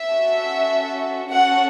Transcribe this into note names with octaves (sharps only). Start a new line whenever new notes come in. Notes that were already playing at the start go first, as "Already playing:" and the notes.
Already playing: E5
C#4 F#4 A4
C#4 F#4 A4 F#5